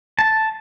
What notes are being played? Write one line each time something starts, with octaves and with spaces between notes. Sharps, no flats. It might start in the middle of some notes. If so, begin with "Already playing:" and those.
A5